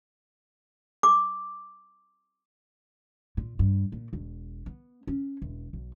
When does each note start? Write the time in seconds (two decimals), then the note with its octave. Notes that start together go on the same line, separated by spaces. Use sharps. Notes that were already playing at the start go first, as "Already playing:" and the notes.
1.03 D6
3.37 A#2
3.59 G2
3.92 A#2
4.13 E1
4.66 B3
5.07 C#4
5.42 E1
5.73 B1